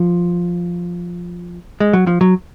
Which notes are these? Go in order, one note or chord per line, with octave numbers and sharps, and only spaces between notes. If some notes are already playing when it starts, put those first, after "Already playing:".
Already playing: F3
G#3
F#3
F3
F#3